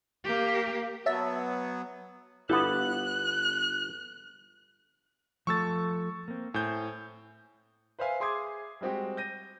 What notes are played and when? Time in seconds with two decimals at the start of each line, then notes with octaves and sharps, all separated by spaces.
0.24 A#3 G4
1.06 F#3 B3 C#5 E5 A5
2.49 G1 B3 E4 G4 A4 F#6
5.47 F3 A3 A4 C#6 E6 A6
6.28 A#3 C4
6.54 A2 C5 G#5 G6
7.99 B4 C5 E5 F5 G#5
8.20 G#4 E5 C6 D6 D#6 G#6
8.81 G3 G#3 C4 F#4 G4
9.17 G6 A#6 D#7